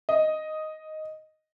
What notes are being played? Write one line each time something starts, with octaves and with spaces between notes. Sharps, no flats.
D#5